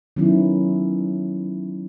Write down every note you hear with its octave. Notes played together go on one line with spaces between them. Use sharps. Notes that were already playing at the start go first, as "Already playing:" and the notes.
D#3 F#3 B3 C#4 D#4 E4